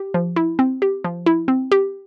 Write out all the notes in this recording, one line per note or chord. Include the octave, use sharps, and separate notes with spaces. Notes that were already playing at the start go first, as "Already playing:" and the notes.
Already playing: G4
F3
E4
C4
G4
F3
E4
C4
G4